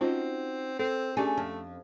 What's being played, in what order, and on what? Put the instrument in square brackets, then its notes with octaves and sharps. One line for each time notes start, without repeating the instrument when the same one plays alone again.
[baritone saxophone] C4 [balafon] C#4 F4 C5 [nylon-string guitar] D#4 F#4 D#5
[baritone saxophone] C4 [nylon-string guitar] A4
[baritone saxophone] A3 [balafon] C#4 D4 G4 [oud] G#4 [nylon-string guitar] D5
[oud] F2 [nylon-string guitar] A5